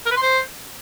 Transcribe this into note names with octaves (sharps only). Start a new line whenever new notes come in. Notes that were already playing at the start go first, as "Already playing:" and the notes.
A#4
B4
C6
C5